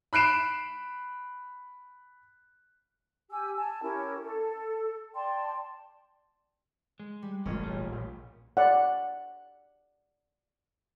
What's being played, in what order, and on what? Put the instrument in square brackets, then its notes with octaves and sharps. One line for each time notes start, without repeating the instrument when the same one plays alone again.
[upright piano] B5 F#6 C7 D7 E7
[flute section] G4 G#5 E6
G#5 A5
C#4 E4 G4 A#4
A4
D5 G5 A5 C6
[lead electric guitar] G#3
[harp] G3
[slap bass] E1 A1 A3 [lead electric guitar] G#2 [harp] C#4 F4
[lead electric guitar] A#2 G3
[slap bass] A#1
[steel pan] D5 F#5